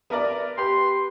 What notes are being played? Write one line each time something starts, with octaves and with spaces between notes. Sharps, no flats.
B3 A#4 D5
G4 B4 C6